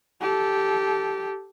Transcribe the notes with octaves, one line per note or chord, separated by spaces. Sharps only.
G4 A4